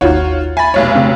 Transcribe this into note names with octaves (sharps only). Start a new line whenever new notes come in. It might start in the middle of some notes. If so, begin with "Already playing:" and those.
G#1 D#2 D#4 F4 F#4 C#5
E5 G#5 B5 A6
F1 B1 C#5
C#3 A3 C4